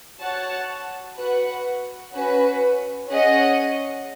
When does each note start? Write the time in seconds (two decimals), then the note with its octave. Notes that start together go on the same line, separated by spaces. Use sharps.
0.20 F#4 C#5 F#5 A5
1.16 F#4 B4 F#5
2.13 C#4 F#4 B4
3.09 C#4 G#4 D#5 F#5